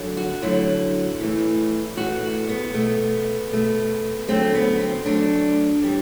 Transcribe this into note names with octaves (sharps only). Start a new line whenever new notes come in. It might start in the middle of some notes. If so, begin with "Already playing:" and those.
Already playing: F#2 D3 F#3 A3
F#4
F#2 D3 F#3 A3 E4
A2 E3 A3
A2 E3 A3 F#4
B3
B2 A3
B2 A3
D2 D3 F#3 A3 C4
B3
C4
D2 D3 F#3 A3 D4
A2 E3 G3